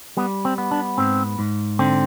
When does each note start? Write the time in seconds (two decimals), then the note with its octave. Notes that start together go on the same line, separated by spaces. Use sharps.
0.17 G3 B3
0.45 C4
0.58 B3
0.71 D4
0.98 G#2 C4
1.39 G#2
1.79 D3 C4